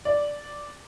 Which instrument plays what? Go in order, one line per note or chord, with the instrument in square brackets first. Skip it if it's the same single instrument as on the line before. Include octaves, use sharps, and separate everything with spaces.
[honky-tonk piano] D5